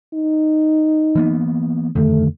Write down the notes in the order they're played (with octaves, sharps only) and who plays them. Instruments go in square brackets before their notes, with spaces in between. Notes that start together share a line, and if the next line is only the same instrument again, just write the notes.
[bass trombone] D#4
[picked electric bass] E3 A#3 B3
[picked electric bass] F2 D3 D#3 [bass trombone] A3